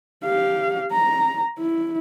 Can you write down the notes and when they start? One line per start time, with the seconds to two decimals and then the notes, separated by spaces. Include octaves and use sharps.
0.24 G4 F5
0.91 A#5
1.59 E4